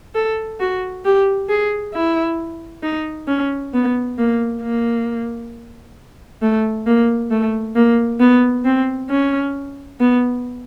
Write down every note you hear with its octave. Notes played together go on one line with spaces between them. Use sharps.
A4
F#4
G4
G#4
E4
D#4
C#4
B3
A#3
A#3
A3
A#3
A3
A#3
B3
C4
C#4
B3